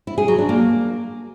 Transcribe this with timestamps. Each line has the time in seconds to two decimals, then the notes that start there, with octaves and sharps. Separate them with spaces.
0.07 E4
0.18 G#4
0.28 F#3
0.38 D4
0.49 A#3